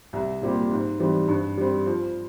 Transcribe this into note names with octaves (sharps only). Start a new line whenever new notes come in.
C2
A#2 G3 C4 G4
G#2
E3 G3 C4
G2
G3 C4
F3